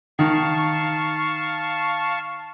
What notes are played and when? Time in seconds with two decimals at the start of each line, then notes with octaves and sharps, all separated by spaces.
0.19 D#3 F5 A5 C#6